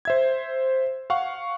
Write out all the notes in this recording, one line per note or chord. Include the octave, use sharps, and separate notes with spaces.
C5 E5 G#6
F5 F#5 C#6